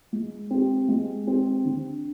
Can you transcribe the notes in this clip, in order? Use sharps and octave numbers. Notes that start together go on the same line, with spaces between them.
G#3
C4 G4
G#3
C4 G4
D3